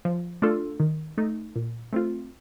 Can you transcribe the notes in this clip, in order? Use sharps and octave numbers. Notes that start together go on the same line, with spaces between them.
F3
A3 D4 F4 A4
D#3
A3 D#4
A#2
A3 C4 F4